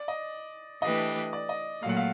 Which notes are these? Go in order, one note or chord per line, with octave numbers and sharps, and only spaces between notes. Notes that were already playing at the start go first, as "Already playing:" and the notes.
Already playing: D5
D#5
E3 A3 D4 G4 B4 D#5
D5
D#5
A#2 F#3 A3 F5
F#5
F5